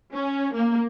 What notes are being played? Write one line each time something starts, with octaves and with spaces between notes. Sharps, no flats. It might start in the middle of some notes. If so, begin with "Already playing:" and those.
C#4
A#3